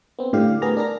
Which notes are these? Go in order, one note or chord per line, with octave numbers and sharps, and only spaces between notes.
B3 C4
A2 D3 G3 G4 F5
B3 G#4 A#4 A#5
D4 A#4 A#6